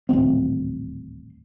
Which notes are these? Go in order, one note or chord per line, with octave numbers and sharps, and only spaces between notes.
D#1 A1 D2 C4